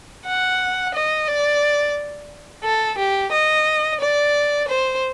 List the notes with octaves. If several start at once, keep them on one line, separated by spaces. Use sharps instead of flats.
F#5
D#5
D5
A4
G4
D#5
D5
C5